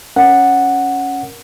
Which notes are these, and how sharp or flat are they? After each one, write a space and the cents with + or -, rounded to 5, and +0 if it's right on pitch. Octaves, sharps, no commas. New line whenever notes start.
C#4 +0 A#4 +0 F#5 +0